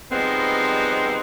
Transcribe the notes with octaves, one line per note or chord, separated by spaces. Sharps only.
F3 G3 G#3 B3 C4 D#4